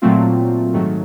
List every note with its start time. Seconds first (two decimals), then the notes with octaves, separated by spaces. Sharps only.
0.02 A#2 F#3 A3 C4 F4
0.73 G#2 D#3 F#3 A3